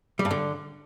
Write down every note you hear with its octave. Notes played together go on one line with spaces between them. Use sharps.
G3
G2
D3